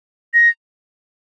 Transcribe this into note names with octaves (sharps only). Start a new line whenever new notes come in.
A#6